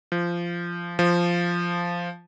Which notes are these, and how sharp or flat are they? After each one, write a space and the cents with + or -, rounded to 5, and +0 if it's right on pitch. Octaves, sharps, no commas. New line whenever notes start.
F3 -15
F3 -5